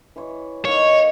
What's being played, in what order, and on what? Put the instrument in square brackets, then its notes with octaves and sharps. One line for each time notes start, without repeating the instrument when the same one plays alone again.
[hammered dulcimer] E3 C#5
[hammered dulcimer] A#3 D#4 [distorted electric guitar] C#5